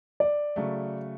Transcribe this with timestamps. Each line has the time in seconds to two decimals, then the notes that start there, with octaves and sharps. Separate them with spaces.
0.20 D5
0.56 C#3 F#3 A3